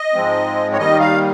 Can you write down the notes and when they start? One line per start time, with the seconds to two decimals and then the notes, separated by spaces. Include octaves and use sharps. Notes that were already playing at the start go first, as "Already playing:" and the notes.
Already playing: D#5
0.13 G#2 F3 G#3 C4
0.73 C#5
0.78 D#2 D#3 G3 D#5
1.00 F5